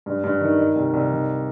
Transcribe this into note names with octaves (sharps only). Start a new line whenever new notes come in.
G2
G2
D#3
D#3
C2
C2
D#3